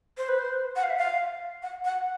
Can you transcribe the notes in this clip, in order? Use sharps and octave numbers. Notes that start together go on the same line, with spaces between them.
C5
B4
C5
F#5
F5
E5
F5
F#5
F#5